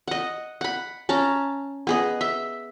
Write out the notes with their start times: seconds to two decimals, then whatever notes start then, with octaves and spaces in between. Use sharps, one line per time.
0.08 D#5 F#5
0.61 F#5 B5
1.09 C#4 A5 A#5
1.87 B3 G#4 D#5
2.21 E5